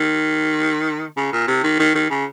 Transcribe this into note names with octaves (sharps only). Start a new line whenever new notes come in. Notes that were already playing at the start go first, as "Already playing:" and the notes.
Already playing: D#3
C#3
A#2
C3
D#3
D#3
D#3
C#3